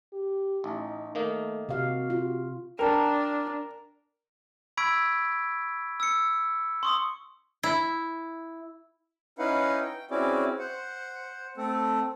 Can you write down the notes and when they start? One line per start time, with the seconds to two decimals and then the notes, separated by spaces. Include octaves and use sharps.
0.13 G4
0.64 A1 D#4
1.15 D#3 A3 A#3 D#4
1.69 C3 F#4 F5
2.10 F4
2.79 D4 A#4 G5 A5 A#5
4.77 B5 C#6 E6 G#6 B6 D7
6.00 E6 C#7
6.83 C6 C#6 D#6
7.63 E4
9.39 C#4 D#4 E4 B4 F5 F#5
9.81 G5
10.11 C4 C#4 E4 F#4 G#4 D5
10.59 C5 F#5
11.57 A3 C4 A4